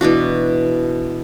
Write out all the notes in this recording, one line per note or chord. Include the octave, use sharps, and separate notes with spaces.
B2 E3 D4 F#4